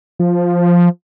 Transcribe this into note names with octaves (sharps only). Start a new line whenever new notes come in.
F3